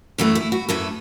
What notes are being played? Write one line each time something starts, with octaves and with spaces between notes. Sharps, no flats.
F#2 E3 A3 F#4
E4
F#4
F#2 E3 A3 A4